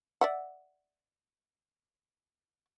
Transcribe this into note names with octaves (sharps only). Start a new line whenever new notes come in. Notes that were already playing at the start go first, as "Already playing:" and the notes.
D5 E5 F#5